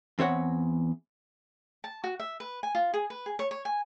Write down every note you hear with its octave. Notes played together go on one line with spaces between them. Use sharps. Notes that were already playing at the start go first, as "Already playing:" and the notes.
E2 C4 C#5 F#5
A5
F#4
E5
B4
G#5
F4
G#4
B4
G#4
C#5
C#5
G#5